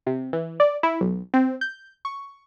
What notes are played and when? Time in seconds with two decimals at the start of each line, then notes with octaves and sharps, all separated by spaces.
0.07 C3
0.33 E3
0.60 D5
0.83 E4
1.01 B1
1.34 C4
1.61 G6
2.05 C#6